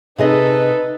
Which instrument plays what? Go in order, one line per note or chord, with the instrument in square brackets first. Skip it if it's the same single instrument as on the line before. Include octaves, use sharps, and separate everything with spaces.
[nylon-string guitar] C3 G#4 D#5 [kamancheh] D#4 A4 [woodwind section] B4